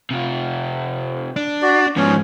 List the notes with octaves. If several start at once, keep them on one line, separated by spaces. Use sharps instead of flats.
C3 F4
D4
F#4 D5
G#2 F3 B3 C#4